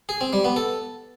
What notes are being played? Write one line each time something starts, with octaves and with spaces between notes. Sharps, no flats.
G#4
C4
G3
B3
A4